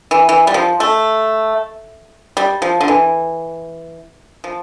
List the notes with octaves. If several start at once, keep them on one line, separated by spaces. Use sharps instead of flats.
E3
E3
G3
F3
A3
G3
F3
D3
E3
F3